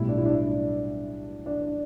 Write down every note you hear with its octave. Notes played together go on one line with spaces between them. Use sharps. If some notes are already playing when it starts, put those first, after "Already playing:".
Already playing: B1 A2 G3 E4
D4
E4
D4
D4